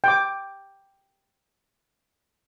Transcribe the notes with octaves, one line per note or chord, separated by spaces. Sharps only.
G5 D6